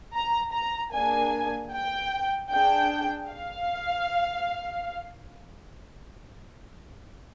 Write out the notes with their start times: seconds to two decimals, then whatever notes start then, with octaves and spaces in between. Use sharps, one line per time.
0.15 A#5
0.54 A#5
0.93 A#3 D4 G#4 G#5
1.72 G5
2.51 D4 G#4 G5
3.29 F5